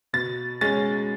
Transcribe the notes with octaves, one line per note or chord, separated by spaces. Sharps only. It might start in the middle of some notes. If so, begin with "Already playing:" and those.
B2 A6
G#3 C#4 A6